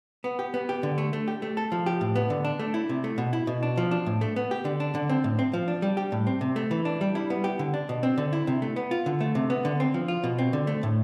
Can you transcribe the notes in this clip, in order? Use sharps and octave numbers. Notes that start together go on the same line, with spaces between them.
B3
G4
B3
G4
D3
A3
A3
G4
A3
A4
F3
G4
A2
B3
D3
D4
A3
E4
C3
A3
B2
E4
B2
D4
F3
D4
A2
A3
B3
G4
D3
D4
D3
C4
A2
C4
F3
D4
G3
G4
A2
C4
C3
A3
E3
D4
G3
E4
B3
G4
D3
D4
B2
C4
D3
E4
C3
A3
B3
F4
D3
A3
C3
B3
D3
C4
F3
F4
B2
C4
D3
A3
A2